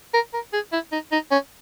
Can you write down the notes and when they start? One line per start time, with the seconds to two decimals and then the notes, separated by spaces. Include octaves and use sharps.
0.14 A#4
0.34 A#4
0.53 G#4
0.73 E4
0.92 D#4
1.12 D#4
1.32 C#4